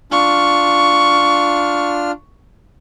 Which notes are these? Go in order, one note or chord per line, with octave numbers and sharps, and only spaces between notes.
D4 F4 C#6 F6